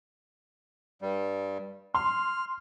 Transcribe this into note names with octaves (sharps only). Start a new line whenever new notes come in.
G2 G3
C6 F6